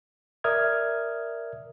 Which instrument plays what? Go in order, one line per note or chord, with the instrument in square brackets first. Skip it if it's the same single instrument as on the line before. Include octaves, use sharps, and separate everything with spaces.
[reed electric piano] A#4 D5 E5 D#6 F6 G#6